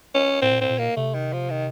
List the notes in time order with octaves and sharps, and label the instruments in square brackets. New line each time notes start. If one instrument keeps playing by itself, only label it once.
[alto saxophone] C#4
[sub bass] A2 [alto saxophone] C4
[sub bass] A#2
[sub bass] A2 [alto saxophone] C4
[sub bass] A#2
[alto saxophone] A#3
[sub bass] C3 [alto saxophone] A3
[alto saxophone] D#3
F3
D#3